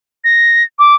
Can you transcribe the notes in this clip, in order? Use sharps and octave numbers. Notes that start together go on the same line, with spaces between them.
A#6
D6